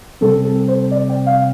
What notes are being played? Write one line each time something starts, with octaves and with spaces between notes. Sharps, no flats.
C3 G3 C4 A4
A4
C5
D5
G5
F5